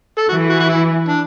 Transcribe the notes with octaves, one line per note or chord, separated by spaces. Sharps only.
A4
E3 F#4
F#4
F#4
E4
D4